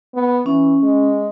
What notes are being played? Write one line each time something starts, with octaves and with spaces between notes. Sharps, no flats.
B3
E3 C#4
G#3